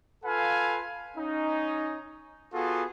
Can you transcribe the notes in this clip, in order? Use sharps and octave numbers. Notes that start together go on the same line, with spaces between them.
F4 A4 B4 F5 G#5
C#4 D#4
B3 F4 F#4 G#4 A4